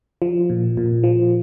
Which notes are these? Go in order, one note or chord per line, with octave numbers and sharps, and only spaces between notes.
F3
A#2
A#2
F3